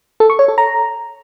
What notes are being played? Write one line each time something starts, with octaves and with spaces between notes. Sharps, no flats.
A4
C#6
C#5
A4
A#5